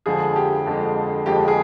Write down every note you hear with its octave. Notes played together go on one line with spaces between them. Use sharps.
F2 D3 F3 G#3 G#4
G4
F2 D3 F3 G#3
F2 D3 F3 G#3 G4
G#4